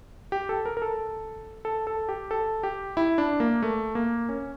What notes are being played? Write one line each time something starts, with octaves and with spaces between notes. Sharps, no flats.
G4
A4
A#4
A#4
A4
A4
A4
G4
A4
G4
E4
D4
A#3
A3
A#3
C#4